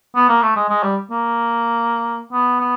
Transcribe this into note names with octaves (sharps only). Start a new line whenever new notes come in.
B3
A#3
A3
G#3
G#3
G3
A#3
B3
B3